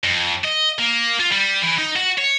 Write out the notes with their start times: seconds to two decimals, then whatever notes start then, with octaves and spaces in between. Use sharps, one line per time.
0.04 F2
0.44 D#5
0.79 A#3
1.20 F4
1.32 G3
1.62 E3
1.78 D#4
1.96 F#4
2.18 C#5